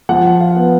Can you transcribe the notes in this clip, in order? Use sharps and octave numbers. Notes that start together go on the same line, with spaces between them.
F3 F#5
F5
B3